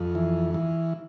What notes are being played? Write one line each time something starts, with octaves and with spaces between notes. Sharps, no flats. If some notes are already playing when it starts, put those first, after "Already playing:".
Already playing: F2
E3
E3